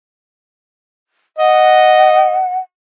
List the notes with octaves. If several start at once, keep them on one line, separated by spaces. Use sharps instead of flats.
D#5 F#5